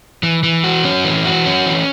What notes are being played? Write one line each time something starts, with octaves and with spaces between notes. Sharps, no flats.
E3
E3
F#4
C#4
E3
F#4
C#4
E3